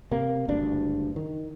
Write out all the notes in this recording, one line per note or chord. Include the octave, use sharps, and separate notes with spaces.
C3 A#3
F#1 D2 G2 D4
D#3